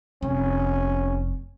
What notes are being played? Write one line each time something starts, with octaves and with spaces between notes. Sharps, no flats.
F1 C#4